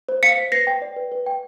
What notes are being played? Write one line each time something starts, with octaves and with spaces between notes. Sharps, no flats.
C5
F5 B6 C#7
C5
B4 A#6 C7
G5
D5
B4
B4
G5